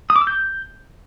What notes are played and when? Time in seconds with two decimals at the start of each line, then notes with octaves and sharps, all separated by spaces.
0.10 D#6
0.16 D6
0.21 E6
0.27 G6